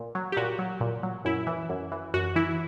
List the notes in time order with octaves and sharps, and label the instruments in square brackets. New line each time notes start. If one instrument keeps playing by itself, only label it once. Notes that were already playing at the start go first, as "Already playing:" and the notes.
Already playing: [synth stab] A#2
F#3
G4
A#2 F#4
F#3
A#2
F#3
F#2 E4
E3
F#2
E3
F#2 F#4
E3 E4